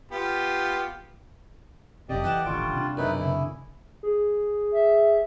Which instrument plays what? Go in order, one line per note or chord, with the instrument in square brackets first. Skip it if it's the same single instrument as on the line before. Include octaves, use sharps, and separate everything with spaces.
[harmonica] B3 F4 G4
[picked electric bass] F1 F#2 C3 [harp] A3 [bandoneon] G4 D5 D#5
[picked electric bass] E3 [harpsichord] F#5 G5 A5
[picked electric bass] D#1 A1 D3 [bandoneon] G3 F4 [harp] C#6 D6 D7
[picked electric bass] C3 D4
[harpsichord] F#2 B2 [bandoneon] D#4 E4 B4 [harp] F#4 G#4 D5
[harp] C#3 D#6 [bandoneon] E4
[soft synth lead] G#4
[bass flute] E5